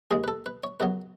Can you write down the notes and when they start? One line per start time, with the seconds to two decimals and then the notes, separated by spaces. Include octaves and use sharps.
0.11 D#2 C#3 G#3 G#4
0.24 B4
0.28 A4
0.46 B4
0.64 C#5
0.80 F#2 C#3 F#3 B3 B4